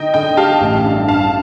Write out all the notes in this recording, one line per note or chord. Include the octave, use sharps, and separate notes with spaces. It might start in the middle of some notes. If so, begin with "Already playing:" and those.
Already playing: D3 D#4 D#5 G5
D3 D#5 G5
G4 F5 A5
A1
G2
G2 F5 A5